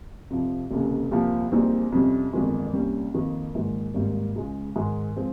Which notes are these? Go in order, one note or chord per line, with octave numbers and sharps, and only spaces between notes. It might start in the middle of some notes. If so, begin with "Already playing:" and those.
F2 C3 F3
F1 D#2 C#3
C2 A#2 F3
A#1 A#2 G3 C4 D#4
F2 C3 G3 C#4
G1 F2 D#3 G#3
C2 A#2 G3 C#4
F2 D#3 A#3
A#1 G#2 D#3
G#1 G#2 G3 A#3
C#2 C#3 G#3
G#2 D#3 G#3
F3 G#3 C4